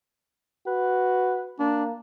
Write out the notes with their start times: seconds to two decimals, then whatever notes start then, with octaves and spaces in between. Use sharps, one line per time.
0.67 F#4 B4
1.59 A#3 D4